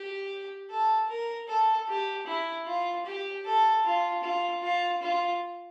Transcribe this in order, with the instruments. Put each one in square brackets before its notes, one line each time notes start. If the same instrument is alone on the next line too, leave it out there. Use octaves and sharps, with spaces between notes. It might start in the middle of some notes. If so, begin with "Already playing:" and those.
Already playing: [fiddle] G4
A4
A#4
A4
G4
E4
F4
G4
A4
F4
F4
F4
F4